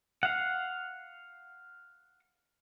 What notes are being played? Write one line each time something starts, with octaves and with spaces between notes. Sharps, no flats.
F5 F#5